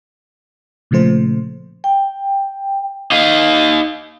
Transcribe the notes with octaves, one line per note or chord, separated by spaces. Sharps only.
A#2 C#3 F3 A3 C5
G5
D#4 F5